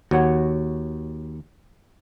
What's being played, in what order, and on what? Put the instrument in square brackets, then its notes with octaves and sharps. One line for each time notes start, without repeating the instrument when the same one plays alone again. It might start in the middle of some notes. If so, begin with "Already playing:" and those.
[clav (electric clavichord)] D#2 [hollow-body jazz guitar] F#4 C#5 F#5